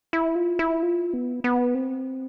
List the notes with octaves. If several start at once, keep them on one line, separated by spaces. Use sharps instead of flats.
E4
F4
E4
F4
B3
B3
C4